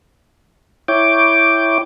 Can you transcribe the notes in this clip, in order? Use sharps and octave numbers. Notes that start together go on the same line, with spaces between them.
E4 C#5 G5 D6